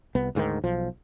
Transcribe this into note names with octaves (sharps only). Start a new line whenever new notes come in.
C2 B3
D2 G#2 D3 D#3
B1 F3